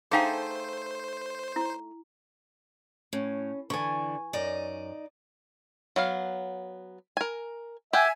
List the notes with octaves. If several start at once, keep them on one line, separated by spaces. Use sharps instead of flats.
A3 D#4 G#4 C5 F5 G5 G#5
E4
A2 C#4
D3 E3 D5 G#5 C#6
F#2 D#4 D5 D#5
F#3 B3 F5
A#4 G#5
G4 E5 F#5 G#5